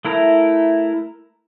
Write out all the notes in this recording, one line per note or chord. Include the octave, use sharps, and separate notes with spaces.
A3 E4 A#4